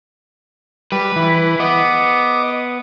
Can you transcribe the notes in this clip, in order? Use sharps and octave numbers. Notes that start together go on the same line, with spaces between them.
G3 B4
E3
B3 D#5 D6